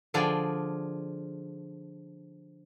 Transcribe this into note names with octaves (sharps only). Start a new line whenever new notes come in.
D3 F3 F4 G#4 D5 G5